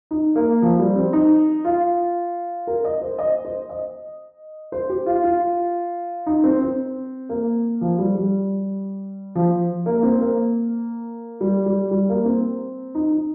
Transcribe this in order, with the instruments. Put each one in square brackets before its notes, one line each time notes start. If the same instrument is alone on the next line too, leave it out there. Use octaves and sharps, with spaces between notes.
[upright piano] D#4
A#3
F3
G3
C4
D#4
F4
A#4
D#5
C5
D#5
C5
D#5
C5
G4
F4
F4
D#4
C4
C4
A#3
F3
G3
G3
F3
A#3
C4
A#3
G3
G3
G3
A#3
C4
D#4
D#4